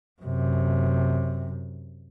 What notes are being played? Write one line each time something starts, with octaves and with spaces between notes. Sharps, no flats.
F#2 C3